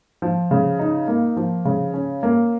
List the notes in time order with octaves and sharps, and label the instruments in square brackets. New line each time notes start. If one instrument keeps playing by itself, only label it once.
[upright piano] F3
C#3
D#4
A#3
F3
C#3
C#4
A#3